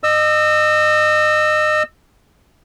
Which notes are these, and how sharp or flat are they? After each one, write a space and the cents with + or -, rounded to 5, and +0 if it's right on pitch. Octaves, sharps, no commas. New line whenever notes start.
D#5 -30 E6 +0